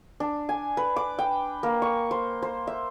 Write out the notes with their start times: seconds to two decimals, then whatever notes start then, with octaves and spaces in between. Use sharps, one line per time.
0.20 D4
0.49 G#5
0.77 B4
0.96 D6
1.19 G5
1.63 A#3
1.82 C#6
2.11 C5
2.42 C5
2.67 E5